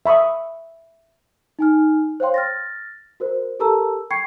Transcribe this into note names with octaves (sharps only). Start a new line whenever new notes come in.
E5 B5 C#6 D#6
D#4 G#5 F6
C5 C#5 F5 G5 C6
F6 A6 A#6
F#4 A#4 C5
G4 A4 A#4 A5 A#5 E6
G5 B5 C#6 G#6 C7 C#7